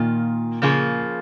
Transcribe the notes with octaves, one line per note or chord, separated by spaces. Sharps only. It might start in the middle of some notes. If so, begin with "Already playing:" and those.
Already playing: A#2 D#3 A#3 F4
C#3 F3 A#3 F4 G#4